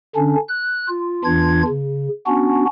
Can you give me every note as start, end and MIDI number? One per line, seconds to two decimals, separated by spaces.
0.16 0.36 50
0.16 0.36 61
0.16 0.36 62
0.48 0.88 90
0.89 1.24 65
1.24 1.63 40
1.24 1.63 52
1.24 1.63 62
1.24 1.63 65
1.24 1.63 92
1.67 2.08 49
2.27 2.65 59
2.27 2.65 61
2.27 2.65 62
2.27 2.65 66